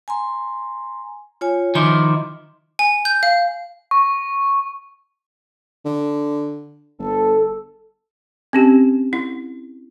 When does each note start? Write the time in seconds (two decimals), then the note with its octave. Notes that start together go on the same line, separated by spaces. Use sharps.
0.08 G#5 A#5 C6
1.41 F4 C#5 G#5
1.75 D#3 F3 E4 D#5 C6 D6
2.79 G#5
3.05 G6
3.23 F5
3.91 C#6
5.85 D3
6.99 G1 A4
8.53 C4 C#4 G4
9.13 E4